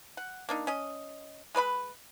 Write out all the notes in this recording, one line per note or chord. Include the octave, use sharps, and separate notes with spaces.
F#5
A#3 D4 D#4
C#4 D#5
G#3 B4 D5 B5